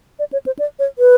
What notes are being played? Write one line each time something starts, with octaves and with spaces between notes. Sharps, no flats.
D5
C#5
C5
D5
C#5
B4